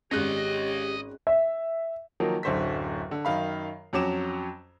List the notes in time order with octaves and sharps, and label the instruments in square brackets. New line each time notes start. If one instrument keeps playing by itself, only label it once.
[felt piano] G#1 F#6 A#6 [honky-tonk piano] G#3 C#4 [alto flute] G4 [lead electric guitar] C#5 D#5
[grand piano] E5
D#3 F3 F#3 A#3
D1 F#2 D3 C5 C#6 B6
D3
F#2 D#3 F5 B5
F2 F#3 C#4 D6 E7